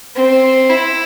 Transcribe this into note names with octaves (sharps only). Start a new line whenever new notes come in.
C4
E4